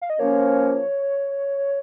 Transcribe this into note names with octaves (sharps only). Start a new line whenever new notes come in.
F5
D#5
F3 A#3 C#4 C#5